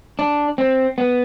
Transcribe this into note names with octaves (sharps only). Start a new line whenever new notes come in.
D4
C4
B3